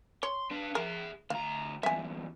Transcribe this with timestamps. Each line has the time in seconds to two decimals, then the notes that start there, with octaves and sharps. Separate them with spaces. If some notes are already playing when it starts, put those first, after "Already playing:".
0.23 C#5 C6
0.51 D4 B4
0.75 G#4 A#4 E5
1.30 D2 F5 A#5
1.83 E2 G2 E5 G#5